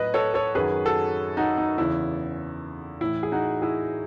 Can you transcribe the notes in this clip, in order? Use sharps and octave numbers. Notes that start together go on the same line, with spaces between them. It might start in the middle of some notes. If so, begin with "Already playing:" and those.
Already playing: A2 F#3 B4 D#5
A4 C#5
A4 C#5
F#2 D#3 F#3 G#4 B4
F#4 A4
D#4 F#4
D#4
E2 C#3 E3 E4
A2 E3 E4
G#4
D#4 F#4
E4 G#4